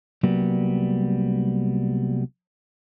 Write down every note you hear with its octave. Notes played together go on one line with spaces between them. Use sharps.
C2 F#3 G3 A#3 B3